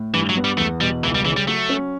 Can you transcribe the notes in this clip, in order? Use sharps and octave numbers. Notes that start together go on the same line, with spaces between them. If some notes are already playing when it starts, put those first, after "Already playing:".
Already playing: A2
G2 E3
F#3
B3
G3
E2 A3
B2 G3
C#2 E3
G3
C#3 E3
G3
F#3 A3
C#4